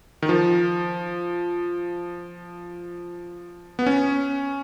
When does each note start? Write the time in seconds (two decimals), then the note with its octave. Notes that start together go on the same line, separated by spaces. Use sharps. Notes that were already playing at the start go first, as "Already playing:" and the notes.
0.22 D#3
0.29 F3
3.79 B3
3.86 C#4